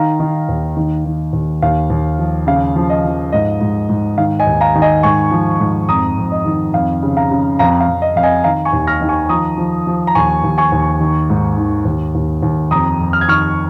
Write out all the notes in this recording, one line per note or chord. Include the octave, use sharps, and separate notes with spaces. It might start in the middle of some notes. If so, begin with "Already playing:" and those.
Already playing: D#3 F5 A#5
D#3
D#2
D#3
D#3
D#2
D#2 F5
D#2
F3
C#3 F5
F3
D#5
F3
G#2 D#5
G#2
G#2
D#3 F5
D#5 G#5
D#2
F5 A#5
D#3
D#5 G#5
G#2 G#5 C#6
F3
G#2
F2 A#5 D#6
F2
D#5
D#3
F2 F5
C#3
F5 A#5
C#3
F2 F5 A#5
F5
F2
D#5
F2 F5
D#5 G#5
D#3 F5 A#5
G#5 C#6
D#2
F6 A#6
D#3
G#5 C#6
F3 A#5 D#6
F3
F3
A#5
D#2 G#5 C#6
D#2
G#5 C#6
D#2
D#3
G#2
D#3
D#2
D#2
D#2
F2 A#5 D#6
F2
F6
G#6
D#3 C#6 F6